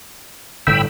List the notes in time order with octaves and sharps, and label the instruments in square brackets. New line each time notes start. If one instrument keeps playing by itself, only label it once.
[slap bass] G1 A2 D3 [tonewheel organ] G5 B5 E6